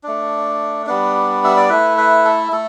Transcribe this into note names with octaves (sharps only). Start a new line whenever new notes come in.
A3 D4
G3 B3 D4
E5
D5
A3 E4 B4
B4
A4
A3 A4